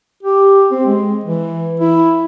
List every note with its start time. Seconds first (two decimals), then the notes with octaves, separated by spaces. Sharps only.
0.23 G4
0.71 C4
0.86 G#3
1.24 E3
1.80 E4